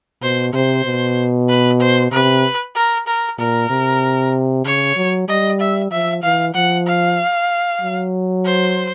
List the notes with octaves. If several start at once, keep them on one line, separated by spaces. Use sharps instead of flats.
B2 C5
C3 C5
B2
B4
C5
C3 B4
A#4
A#4
A#2 A#4
C3
C#3 C#5
F#3
G3 D#5
E5
F3 E5
E3 F5
F3 F#5
F5
F#3
C5